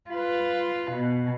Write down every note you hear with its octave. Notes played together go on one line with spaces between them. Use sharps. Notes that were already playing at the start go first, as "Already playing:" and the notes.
F4 B4
B2